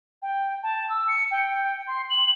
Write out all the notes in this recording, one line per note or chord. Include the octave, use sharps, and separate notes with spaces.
G5
A5
E6
C#7
G5
C6
F#7